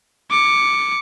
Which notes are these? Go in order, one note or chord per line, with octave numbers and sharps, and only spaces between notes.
D6 C#7